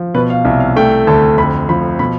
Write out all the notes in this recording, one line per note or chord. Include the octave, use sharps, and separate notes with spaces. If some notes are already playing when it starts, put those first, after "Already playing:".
Already playing: F3
B2 B4
F5
C2 E5
F5
A3 G5
D2 A5
F2 B5
F3 B5
B2 B5